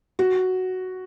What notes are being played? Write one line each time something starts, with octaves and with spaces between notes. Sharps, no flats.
F#4